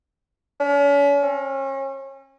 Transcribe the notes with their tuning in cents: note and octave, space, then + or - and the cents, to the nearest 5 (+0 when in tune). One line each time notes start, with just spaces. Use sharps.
C#4 +40
C#4 -35